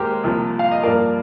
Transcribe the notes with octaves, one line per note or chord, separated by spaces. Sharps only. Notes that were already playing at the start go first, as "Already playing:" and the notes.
Already playing: D#2 G#3 G4 A#4 C5
C2 C3 F3 A#3
F5
D#5
G2 F3 A#3 A#4 D5